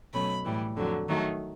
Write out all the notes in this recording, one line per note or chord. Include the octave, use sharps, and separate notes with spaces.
B2 F#3 A3 C#4 B5
A2 E3 G3
F2 D3 F#3
D#3 F#3 A3